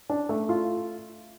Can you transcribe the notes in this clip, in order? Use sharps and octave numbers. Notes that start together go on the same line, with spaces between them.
D4
A3
F4